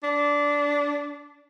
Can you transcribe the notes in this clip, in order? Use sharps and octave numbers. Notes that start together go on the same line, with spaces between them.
D4